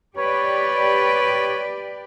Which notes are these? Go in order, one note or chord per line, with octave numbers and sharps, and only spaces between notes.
G4 B4 C#5 D5